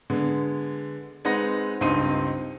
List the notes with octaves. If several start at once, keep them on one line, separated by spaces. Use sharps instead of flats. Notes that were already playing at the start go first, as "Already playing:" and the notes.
D3 G#3 B3
G#3 C4 D#4 B4 F#5 A#6
C#2 G2 C4 D#4 C6 D#7